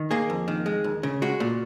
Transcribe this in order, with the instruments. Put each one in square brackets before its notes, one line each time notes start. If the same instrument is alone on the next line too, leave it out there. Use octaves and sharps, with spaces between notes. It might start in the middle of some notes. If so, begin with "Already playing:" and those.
Already playing: [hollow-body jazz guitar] D#3
A#3 G#4
F2
D#3
G#3
D#2
C#3
G#3 F#4
A#2